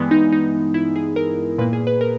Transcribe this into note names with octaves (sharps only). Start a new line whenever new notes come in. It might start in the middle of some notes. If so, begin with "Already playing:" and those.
Already playing: G2 E3 G#3 B3
D#4
D#4
E4
G#4
A#4
A#2 A#3 B4
G#4
B4
A#4